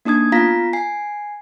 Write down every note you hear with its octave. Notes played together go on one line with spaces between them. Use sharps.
A#3 D4 D#4 D#6 G#6
B3 F4 F5 A#5 A#6 B6
G#5 C7